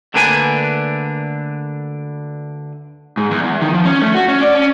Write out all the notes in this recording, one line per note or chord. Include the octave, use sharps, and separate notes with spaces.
D2 D3 A#3 D4 B4 G#5
G#2
E2
E2
D#3
F3
C#4
A3
F#4
C#4
D5
C#4